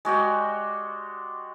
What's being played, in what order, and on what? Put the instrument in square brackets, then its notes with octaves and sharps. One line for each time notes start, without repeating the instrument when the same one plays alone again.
[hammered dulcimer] G#3 F#4 G4 D5